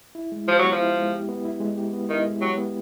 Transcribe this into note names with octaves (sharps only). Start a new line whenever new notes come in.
E4
G#3
F3 G4
F#3
B3
F3
E4
G#3
G4
B3
E4
G#3
G4
B3
D#3 E4
G#3
F#3 G4
B3